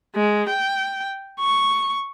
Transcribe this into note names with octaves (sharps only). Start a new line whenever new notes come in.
G#3
G5
C#6